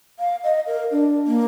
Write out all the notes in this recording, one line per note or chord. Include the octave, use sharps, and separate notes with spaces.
F5
D#5
A#4
D4
A#3